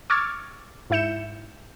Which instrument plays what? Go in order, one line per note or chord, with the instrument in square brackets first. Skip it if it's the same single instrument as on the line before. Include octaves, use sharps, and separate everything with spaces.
[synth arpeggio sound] C#6 D6 E6 F6 G#6 A6
G#2 E4 E5 G6 C#7 E7